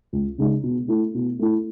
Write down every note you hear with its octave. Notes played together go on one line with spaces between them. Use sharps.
C#2
C#3 G#3 D#4
B2
A3 E4
B2
A3 E4